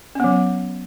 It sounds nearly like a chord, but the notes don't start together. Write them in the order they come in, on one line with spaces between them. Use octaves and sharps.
C#4 B3 F#3